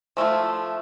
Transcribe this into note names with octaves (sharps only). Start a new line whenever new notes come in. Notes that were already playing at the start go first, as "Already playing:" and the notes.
F3 A3 E4 F4